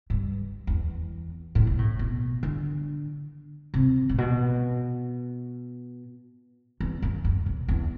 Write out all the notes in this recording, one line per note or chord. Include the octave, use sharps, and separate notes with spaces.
G2
E2
A2
B2
A2
B2
D3
C3
A2
B2
E2
F#2
F#2
B2
E2